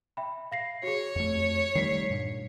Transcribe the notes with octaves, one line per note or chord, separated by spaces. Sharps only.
E5 G5 B5
F5 A#6 C7
F#4 G#4 C#5
F2 A3
D#3 G3 A3 B6 C7
G2 A#2